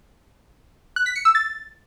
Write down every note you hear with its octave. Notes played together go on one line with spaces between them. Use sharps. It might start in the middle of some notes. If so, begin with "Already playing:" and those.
F#6
B6
C#7
E6
A6